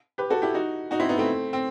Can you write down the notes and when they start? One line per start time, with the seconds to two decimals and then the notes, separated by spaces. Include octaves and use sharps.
0.18 G4 B4
0.30 F#4 A4
0.42 E4 G4
0.54 D#4 F#4
0.91 D#4 F#4
1.00 C4 E4
1.09 B3 D#4
1.18 A3 C4
1.53 C4